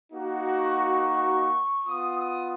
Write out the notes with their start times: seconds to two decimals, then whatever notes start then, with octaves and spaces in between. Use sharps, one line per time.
0.11 A#3 D#4 F#4
0.55 C#6
1.87 B3 F4 D#6
2.16 D#6